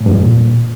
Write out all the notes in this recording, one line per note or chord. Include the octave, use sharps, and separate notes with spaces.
A2
G2
F2
A#2